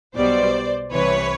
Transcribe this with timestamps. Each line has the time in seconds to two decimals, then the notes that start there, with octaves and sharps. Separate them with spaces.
0.15 B1 B2 G3 B3 C5 D5
0.92 C2 C3 E3 B4 C#5